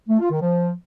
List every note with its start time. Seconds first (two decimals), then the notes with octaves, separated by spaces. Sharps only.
0.09 A3
0.20 F4
0.31 D#3
0.42 F3